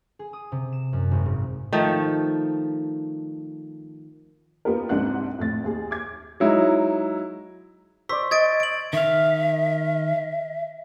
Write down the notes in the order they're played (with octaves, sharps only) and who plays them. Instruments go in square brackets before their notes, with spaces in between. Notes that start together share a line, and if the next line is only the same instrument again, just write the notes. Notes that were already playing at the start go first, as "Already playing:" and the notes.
[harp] G#4
D#6
C3
E7
F#2
G#1
G#2
[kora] D#3 F3 A3
[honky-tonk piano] A#3 B3 F4 G4 A#4
C2 G#2 C4 D4 F#5 F#6
F2 A2 A6
D#2 G#4
D6 G#6
[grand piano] F#3 G#3 D#4 E4
[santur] C5 D5 [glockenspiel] C#6 E6 B6
[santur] D#5 [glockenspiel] G#6 A6 D7
[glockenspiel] D7 F#7
[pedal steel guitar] D#3 F5 [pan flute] E5